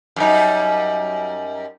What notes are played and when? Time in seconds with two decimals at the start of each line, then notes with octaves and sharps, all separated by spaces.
0.16 F#2 G3 D#4